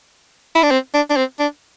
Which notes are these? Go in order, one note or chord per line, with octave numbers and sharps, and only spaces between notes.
E4
D4
C4
D4
D4
C4
D4